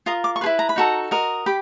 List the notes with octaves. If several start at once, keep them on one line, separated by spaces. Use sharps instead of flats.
F4 A#4 D#6
D6
C#6
G#4 B4 C6
E4
A#5
B5
D#4 F#4 A4 A#5
F#4 A#4 D#5
G4 B5